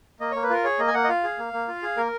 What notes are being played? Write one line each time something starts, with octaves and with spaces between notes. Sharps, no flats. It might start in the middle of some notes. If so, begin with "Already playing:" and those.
A#3 D#5
A#3 C#5
B4
F4 A#4
G#4 C#5
A#3 D#5
G#5
A#3 F#5
D#5
F4 F5
G#4
A#3
A#3
F4
G#4
A#3 A#4